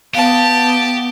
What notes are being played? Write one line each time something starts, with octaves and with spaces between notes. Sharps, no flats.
B3 G4 F5 A5